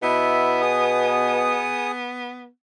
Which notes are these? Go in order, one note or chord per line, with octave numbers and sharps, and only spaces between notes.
B2 B3 E4 E5
G#4 D#6